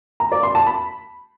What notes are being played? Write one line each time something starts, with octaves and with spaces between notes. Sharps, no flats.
A#5
D5
C6
A5
B5